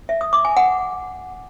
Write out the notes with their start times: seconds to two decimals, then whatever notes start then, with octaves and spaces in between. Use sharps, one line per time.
0.09 E5
0.21 D#6
0.33 D6
0.45 G#5
0.57 F#5